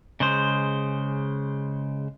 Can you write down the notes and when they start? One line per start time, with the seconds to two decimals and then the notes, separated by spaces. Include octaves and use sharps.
0.20 C#3 G#3 C5